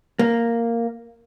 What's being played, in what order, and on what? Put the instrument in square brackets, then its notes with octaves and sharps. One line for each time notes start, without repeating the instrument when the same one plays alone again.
[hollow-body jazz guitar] A#3